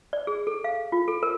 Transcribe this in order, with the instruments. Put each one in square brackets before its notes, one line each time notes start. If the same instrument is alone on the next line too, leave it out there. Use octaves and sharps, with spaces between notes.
[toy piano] D5
G#4
A4
F5
F4
A4
A#4